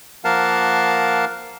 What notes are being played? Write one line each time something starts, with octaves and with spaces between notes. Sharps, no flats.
F3 A#3 A#4 F5 F#5 A5